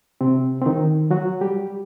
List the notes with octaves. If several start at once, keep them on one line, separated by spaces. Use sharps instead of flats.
C3 C4
C4
D#3 D#4
F#3 F#4
G3 G4